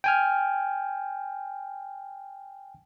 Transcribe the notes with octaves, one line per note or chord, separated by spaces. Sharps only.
G5 G#5 F6